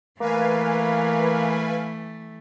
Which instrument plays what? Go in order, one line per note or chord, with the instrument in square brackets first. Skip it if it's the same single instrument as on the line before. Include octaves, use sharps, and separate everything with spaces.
[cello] E3 A3 [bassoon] A#3 [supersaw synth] B4 F5 G#5